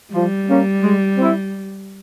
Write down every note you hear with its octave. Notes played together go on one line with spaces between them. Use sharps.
F3 G3
A#3 C#4
G#3
C4
E4